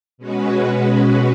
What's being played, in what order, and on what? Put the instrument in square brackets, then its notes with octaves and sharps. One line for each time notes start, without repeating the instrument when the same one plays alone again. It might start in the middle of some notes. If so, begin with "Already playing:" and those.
[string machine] B2 G#3 C#4 F#4 B4